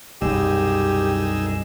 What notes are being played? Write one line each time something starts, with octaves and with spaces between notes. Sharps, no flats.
C2 F#2 B2 D#4 G4 G#4 E6